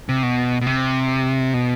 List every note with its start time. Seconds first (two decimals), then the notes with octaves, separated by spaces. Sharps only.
0.09 C3
0.23 B2
0.61 B2
0.67 C3
1.54 B2